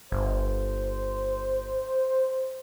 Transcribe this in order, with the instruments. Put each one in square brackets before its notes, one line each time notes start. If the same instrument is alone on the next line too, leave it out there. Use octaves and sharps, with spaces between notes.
[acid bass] G1 [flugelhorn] C5